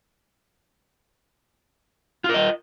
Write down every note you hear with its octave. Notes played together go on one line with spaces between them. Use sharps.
F4 A#4 D#5